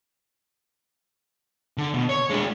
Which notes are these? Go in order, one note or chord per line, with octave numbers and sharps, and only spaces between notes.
D3
B2
C#5
G#3 D4